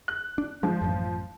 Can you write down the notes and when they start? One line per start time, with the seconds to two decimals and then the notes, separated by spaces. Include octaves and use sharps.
0.08 F#6
0.38 D4
0.63 F3 G#3 D4
0.82 A1 F#2